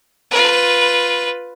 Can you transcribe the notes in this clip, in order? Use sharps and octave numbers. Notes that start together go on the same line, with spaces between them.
F4 B4